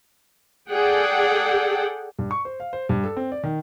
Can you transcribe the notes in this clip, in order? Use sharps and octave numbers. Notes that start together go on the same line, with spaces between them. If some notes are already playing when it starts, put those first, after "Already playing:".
G#4 A4 D5 F#5 G5
G2
C#6
C5
F5
C5
G2
A4
C4
D5
D#3